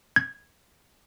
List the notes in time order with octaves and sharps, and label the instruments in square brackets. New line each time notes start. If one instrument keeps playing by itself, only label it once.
[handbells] G#6